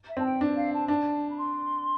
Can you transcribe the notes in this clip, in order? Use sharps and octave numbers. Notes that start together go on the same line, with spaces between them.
E5
C4 A5
G5
D4
F5
A5
D4 A5
B5
C6